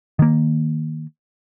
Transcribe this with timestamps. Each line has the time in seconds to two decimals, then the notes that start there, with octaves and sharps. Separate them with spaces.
0.19 D#3 A#3